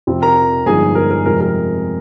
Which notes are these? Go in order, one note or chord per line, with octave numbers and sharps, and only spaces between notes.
F2 C3 F3 C4
A#4 A#5
G1 G2 F3 G#3 D#4 G#4 G#5
A#4
A#4
F2 C3 F3 G#3 A#4
A#4